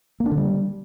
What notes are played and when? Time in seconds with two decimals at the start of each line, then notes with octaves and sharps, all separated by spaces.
0.20 A#3
0.26 D4
0.32 D3
0.37 G3